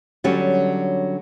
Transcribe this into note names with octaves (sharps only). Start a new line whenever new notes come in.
D3 F#3 G3 C#4